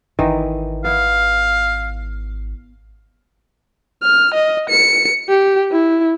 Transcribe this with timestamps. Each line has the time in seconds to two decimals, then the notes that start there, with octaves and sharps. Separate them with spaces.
0.19 G#1 D#3 E3 D#4
0.84 B3 E4 F5
4.03 F6
4.34 D#5
4.69 C#7
5.29 G4
5.72 E4